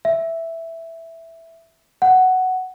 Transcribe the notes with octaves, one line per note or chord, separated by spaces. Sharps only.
E5
F#5